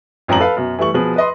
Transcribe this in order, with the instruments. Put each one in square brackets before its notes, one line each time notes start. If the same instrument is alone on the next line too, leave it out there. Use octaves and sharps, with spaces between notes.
[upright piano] A1 F2 F3 C#4 A#5 F#7
A4 B4 F5
F#2 B2
E3 G3 A3 C#6 F#7
B2 F3 G#4 B4 F#7
B4 D#5 C6